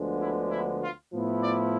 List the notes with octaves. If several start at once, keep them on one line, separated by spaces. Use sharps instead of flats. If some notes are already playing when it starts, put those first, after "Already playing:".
Already playing: D2 D3 F3 G#3 B3
E4
E4
F4
A2 F3 B3 E4
D5